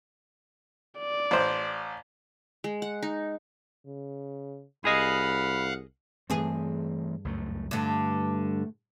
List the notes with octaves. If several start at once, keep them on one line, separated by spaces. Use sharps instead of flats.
D5
A1 C5
G#3
F#5
D#4
C#3
C2 G#4 D#5 F5 F#5 B5
G2 E3 A3 C4 G#4
C#2 F#2 A3
G2 D3 A3